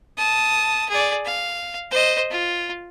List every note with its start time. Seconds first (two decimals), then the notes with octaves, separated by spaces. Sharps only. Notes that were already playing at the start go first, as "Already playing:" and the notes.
0.18 A5 D#6
0.89 G#4 D5
1.25 F5
1.91 C5 D#5
2.31 F4